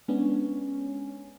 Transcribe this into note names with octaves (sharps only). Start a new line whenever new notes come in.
G#3 B3 C#4 D4